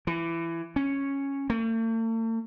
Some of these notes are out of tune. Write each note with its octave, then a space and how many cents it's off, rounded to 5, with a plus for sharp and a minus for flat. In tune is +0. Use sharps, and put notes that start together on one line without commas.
E3 +20
C#4 -5
A3 +45